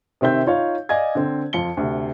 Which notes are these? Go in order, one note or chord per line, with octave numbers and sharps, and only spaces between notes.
C3 D#3 C4 E5 G6
D#4 F4 C#5 F5
D5 D#5 F5 G#5 G#6
D3 C4
F2 F4 C#7 G7
D2 C3